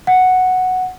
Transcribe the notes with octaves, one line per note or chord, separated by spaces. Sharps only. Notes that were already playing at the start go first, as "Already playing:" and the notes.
F#5